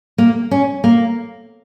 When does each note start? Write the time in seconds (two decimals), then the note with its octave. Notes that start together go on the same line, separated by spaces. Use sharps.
0.18 A#3
0.51 C#4
0.84 A#3